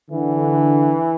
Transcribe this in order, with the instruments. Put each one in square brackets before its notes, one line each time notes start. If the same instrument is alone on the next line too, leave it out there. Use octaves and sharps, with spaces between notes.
[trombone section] D3 [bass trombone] E3